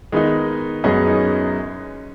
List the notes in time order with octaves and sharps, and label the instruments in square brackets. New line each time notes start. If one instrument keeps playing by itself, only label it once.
[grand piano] D#3 B3 D#4 [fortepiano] G#3
[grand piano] F#2 F#3 B3 G#4 D#5 [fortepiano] C#4
[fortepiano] D#4